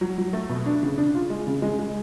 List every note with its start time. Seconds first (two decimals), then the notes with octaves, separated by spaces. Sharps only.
0.01 F#3
0.18 F#3
0.33 A3
0.49 B2
0.66 D4
0.83 C#3
0.98 D4
1.15 F4
1.30 G#3
1.47 C#3
1.62 G#3
1.79 G#3